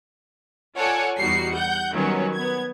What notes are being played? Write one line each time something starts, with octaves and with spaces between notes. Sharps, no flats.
F4 A4 C#5 D5 F#5 G#5
E2 G3 D#4 F#4 C7 C#7
F#5 G6
D#3 F#3 G3 B3 C#4
B3 G#6